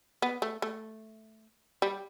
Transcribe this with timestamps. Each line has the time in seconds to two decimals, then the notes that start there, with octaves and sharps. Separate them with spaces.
0.22 B3
0.42 A3
0.62 A3
1.82 G3